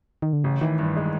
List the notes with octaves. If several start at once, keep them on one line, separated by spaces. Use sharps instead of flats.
D#3
D3
A1 C#3
D#3 E3
G2
G#3